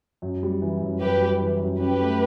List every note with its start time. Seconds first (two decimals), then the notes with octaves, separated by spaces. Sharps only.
0.22 F#2
0.43 G3
0.61 E3
0.82 F#2
1.01 F#2 G4 B4
1.22 G3
1.41 E3
1.61 F#2
1.80 C#4 G4 B4
2.00 A3